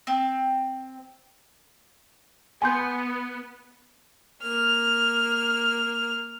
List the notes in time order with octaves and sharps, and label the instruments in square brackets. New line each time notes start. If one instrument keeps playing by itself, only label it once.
[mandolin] C4
[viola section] B3 [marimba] G#5 C6 G6
[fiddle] A#3 F6